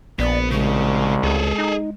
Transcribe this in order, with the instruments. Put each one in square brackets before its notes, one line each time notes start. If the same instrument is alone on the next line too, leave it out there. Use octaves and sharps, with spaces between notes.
[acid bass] A#1 [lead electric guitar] B3 [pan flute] D5
[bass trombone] C2 [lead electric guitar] C#3 [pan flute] G#3
[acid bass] C#2 [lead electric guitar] G#4 A4
[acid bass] D#4